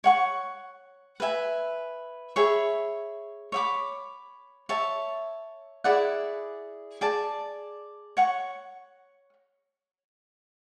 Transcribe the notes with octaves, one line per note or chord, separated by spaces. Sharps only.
C#5 F#5 C#6
B4 E5 G#5
G#4 C#5 E5 B5
C#5 E5 B5 D6
C#5 E5 A5
E4 G#4 D5 F#5
G#4 D5 A5
C#5 F#5 C#6